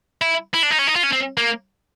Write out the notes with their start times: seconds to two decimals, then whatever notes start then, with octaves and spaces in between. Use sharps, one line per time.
0.22 E4
0.54 E4
0.63 D4
0.71 D#4
0.79 C#4
0.87 D#4
0.96 F4
1.03 C#4
1.12 C4
1.37 A#3